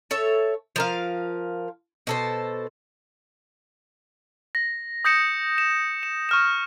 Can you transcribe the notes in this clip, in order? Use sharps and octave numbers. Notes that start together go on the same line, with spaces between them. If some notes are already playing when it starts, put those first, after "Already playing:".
A4 C#5 E5
F3 A#4 F5
B2 A4 C5
A#6
D#6 G6 A#6 C#7 E7
E7
E7
C#6 F6 E7